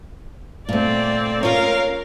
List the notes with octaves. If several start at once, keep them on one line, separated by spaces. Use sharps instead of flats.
A#2 A3 C4 D5
C#4 F4 A#4 C#5 F5